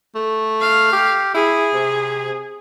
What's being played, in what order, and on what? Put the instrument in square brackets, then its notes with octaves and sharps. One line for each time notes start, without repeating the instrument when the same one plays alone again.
[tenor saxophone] A3
[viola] F5
[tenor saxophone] G4
[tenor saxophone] E4 [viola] G#4
[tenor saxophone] C3